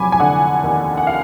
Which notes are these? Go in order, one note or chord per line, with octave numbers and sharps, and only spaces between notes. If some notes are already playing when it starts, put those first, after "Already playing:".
Already playing: F1 F#3 G#5 B5 D6
G#5
D3 F#5
D#2
F#5
F5